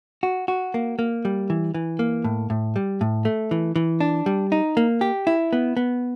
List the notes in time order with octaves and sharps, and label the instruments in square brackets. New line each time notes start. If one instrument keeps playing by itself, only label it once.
[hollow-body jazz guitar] F#4
F#4
A#3
A#3
G3
E3
E3
A#3
A2
A2
G3
A2
A3
E3
E3
D4
G3
D#4
A#3
G4
E4
B3
B3